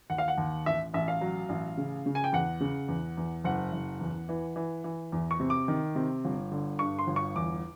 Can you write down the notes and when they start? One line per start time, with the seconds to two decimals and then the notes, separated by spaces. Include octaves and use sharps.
0.10 D#2 F#5
0.18 F5
0.28 F#5
0.38 D#2
0.66 A1 E5
0.94 A1 E5
1.08 F5
1.21 F#3
1.49 A1
1.77 C#3
2.06 C#3
2.15 G#5
2.24 G5
2.33 E2 F#5
2.60 C#3
2.88 E2
3.17 E2
3.44 F#1 F#5
3.73 F#1
4.01 E2
4.29 E3
4.56 E3
4.84 E3
5.12 E2
5.31 C#6
5.40 C3
5.50 D6
5.68 D#3
5.95 C3
6.24 G1
6.52 D3
6.79 G2 C#6
6.99 C6
7.07 G1
7.16 C#6
7.36 E2 D6